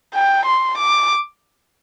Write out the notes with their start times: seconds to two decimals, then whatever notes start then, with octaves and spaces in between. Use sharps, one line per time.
0.14 G5
0.46 C6
0.78 D6